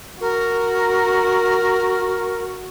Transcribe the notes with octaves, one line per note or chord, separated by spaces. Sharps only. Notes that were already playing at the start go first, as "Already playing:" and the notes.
F#4 A#4